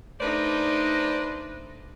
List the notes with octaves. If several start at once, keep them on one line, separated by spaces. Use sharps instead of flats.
A3 D4 D#4 B4 C5 D5